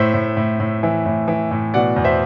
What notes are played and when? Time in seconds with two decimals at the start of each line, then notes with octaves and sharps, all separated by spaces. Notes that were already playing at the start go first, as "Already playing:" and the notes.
Already playing: A2 C5 E5
0.14 A2
0.37 A2
0.60 A2
0.83 E3
1.06 A2
1.28 E3
1.51 A2
1.74 B2 D5 F#5
1.96 E2
2.05 C5 E5